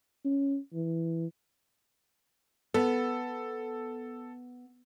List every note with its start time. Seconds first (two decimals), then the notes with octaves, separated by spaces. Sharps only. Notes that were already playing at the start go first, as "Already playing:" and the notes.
0.25 C#4
0.73 E3
2.74 B3 A4